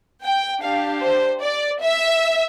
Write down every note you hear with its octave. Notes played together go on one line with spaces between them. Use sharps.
G5
D4 G4 F5
C5
D5
E5